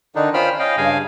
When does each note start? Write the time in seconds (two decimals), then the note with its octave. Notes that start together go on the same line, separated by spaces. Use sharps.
0.15 D3 D#3 D4 D#4
0.34 C#4 F4 C5 G5 B5 F6
0.59 C#4 D#5 F5 G5
0.77 G2 C#3 F5 G#5